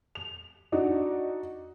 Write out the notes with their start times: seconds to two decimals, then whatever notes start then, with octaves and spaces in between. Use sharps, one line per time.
0.15 F7
0.72 D4 D#4 F#4